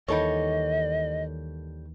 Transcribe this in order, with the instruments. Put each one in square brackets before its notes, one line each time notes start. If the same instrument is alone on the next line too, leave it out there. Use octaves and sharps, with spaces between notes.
[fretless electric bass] D#2 D#3 E3 [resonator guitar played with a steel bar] G3 A4 C#5 [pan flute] D#5